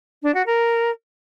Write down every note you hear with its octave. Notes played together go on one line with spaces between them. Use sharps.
D4
F#4
A#4